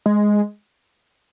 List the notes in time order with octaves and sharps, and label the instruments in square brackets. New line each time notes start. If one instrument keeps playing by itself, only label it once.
[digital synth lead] G#3